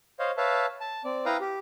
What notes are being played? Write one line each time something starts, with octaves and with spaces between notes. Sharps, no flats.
C5 C#5 D#5 F5
B4 C#5 E5 F5 A5
A5
C4 D5
E4 B4 F5 G5 A#5 D#6
G4